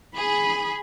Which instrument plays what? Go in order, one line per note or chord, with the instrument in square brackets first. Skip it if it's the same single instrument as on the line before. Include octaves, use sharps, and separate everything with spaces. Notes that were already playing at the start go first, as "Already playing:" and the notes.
[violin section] G#4 [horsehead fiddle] B5